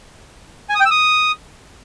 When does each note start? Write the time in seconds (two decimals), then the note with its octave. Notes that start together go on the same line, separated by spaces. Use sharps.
0.69 G#5
0.75 D#6
0.80 G5
0.85 E6
0.91 D#6